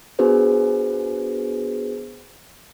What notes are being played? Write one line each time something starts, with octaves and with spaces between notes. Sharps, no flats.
B3 D4 F#4 G#4 B4 C5